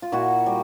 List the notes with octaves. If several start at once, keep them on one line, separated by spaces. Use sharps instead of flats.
F4
A#2 E4 F#4
G3